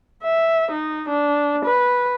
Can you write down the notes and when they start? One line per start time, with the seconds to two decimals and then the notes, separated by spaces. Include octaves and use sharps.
0.24 E5
0.72 D#4
1.09 D4
1.65 B4